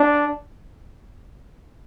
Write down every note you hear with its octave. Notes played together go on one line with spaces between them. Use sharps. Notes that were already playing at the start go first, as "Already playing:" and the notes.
Already playing: D4